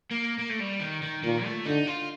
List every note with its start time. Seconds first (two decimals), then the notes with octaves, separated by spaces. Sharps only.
0.11 A#3
0.39 A#3
0.51 A3
0.60 G3
0.81 D#3
1.03 D#3
1.24 A#2 D#3
1.45 A3
1.66 D3 D#4
1.87 F4